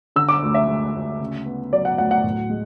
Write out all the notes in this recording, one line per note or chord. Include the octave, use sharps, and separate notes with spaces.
D3 E6
D6
D2
E5
G#3
D2
C#3
B3
F#3 D5
F#5
D2 F#5
F#5
A2
G#3